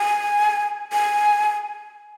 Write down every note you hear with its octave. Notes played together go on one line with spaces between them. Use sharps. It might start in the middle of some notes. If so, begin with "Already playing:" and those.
Already playing: G#5
G#5